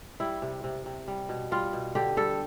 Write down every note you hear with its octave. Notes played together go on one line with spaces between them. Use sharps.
G3 E4
C3
C3
C3
G3
B2
G3 F4
B2
D3 G4
G3 A4